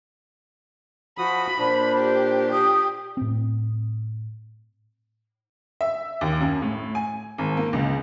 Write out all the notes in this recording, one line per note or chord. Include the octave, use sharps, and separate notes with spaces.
F3 F#4 B5 D#6
A#2 D4 C5
G4
G4 D#6
A2 C4
E5
D#2
F#2
A2
G#5
G#1
A#3
C#2